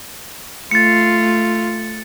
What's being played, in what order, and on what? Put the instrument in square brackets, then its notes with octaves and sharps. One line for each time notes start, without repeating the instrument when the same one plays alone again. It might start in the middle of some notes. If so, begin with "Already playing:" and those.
[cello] A3 F4 [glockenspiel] A6 C#7